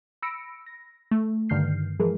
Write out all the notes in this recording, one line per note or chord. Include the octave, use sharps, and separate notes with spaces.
B5 E6 A#6 C#7 D7
A#6
A3
G2 D3 D#3 F6 G6 C7
E3 F3 G#3 G#4 A#4